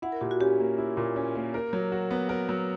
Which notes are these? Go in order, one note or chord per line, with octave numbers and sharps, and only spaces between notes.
E4 F#5
A#4
A#2 G4
F#4
C#4 G4
A#3
E4
A#2
C#4
A#3
A#4
F#3
F#4
B3
A#4
F#3